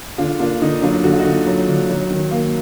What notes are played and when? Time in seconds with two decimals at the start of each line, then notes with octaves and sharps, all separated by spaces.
0.18 D3 D4 F4
0.39 A#3 D4 F4
0.61 D3 D#4
0.82 F#3 D4 F4
1.04 D3 F#4
1.12 F4
1.19 D#4 F#4
1.25 D3
1.47 F#3
1.68 D3
1.90 F#3
2.11 D#3
2.31 A#3